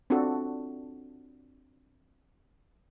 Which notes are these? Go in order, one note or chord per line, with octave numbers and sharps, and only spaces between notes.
C4 D4 F4 F#4 A4